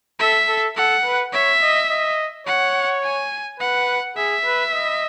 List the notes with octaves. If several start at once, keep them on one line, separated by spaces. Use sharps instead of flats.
A4 E5
A4
A4 F#5
B4
C#5 E5
D#5
D#5
C#5 F#5
G#5
B4 F#5
G#4 E5
B4
D#5